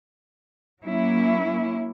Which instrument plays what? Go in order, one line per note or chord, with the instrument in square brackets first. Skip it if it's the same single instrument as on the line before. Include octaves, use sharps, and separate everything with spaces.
[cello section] F#3 A#3 C#4 E4